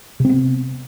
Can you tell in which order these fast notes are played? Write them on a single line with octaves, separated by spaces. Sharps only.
C3 C4 B3